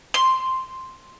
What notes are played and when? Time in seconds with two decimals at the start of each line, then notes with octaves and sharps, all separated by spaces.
0.14 C6